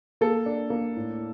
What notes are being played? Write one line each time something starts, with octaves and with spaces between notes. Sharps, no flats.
A#3 A4
D4
A#3
A2